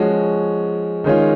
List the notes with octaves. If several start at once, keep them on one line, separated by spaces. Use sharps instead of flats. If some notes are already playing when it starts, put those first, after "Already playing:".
Already playing: F3 G#3 C#4 F#4
D#3 G#3 C#4 F4